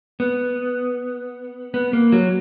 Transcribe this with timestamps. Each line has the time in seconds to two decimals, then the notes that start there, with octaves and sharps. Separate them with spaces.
0.20 B3
1.74 B3
1.93 A#3
2.12 F#3